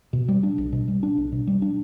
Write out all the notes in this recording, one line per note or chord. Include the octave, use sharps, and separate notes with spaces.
B2
G3
D4
B1
B2
G3
D4
B1
B2
G3
D4